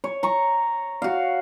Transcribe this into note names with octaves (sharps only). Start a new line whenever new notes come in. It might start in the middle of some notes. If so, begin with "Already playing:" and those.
C#5
A#5 C#6
F#4 F5